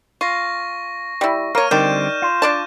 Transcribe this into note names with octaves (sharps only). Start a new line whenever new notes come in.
F4 C#6 A#6
G3 E4
A#3 A#4 C#5 F6 D#7
D3 D#3 G3 C4 D5 G6 E7
F4
D4 D5 A5